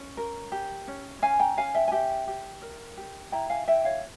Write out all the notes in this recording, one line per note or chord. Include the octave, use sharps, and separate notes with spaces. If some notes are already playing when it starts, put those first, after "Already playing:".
Already playing: C#4
A#4
G4
C#4
C#4 F5 G#5
G5 A#5
C#4 F5 G#5
E5 G5
G#5
G4 E5 G5
G4
A#4
G4
E4 G5 A#5
F5 G#5
E4 E5 G5
C#5 F5